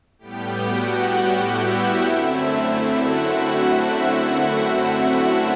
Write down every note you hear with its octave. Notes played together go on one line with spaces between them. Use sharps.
A2 G3 B3 G4 G5
F#4 F#5
G4 G5
E4 E5
F#4 F#5
F#2 D3 A3 C4 E4 E5
F#4 F#5